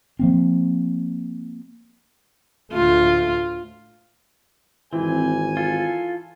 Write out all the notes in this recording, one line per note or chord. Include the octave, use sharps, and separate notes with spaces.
F3 A#3 C4
D2 A2 A3 F4
G#1 E3 C4 G#5
F4 A4